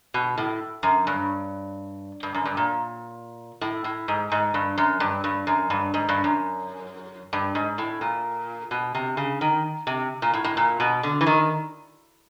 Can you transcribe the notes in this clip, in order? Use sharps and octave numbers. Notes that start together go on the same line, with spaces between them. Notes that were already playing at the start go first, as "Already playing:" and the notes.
B2
A2
F#2
G2
G2
F#2
G2
A#2
A2
A2
G#2
G#2
G2
F#2
G2
G2
F#2
G2
G#2
G2
F#2
G2
G#2
A2
A#2
B2
C3
C#3
D#3
C3
A#2
A2
A2
A#2
B2
D3
E3
D#3